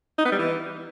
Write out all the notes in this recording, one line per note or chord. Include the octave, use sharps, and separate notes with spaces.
D#4
B3
G3
E3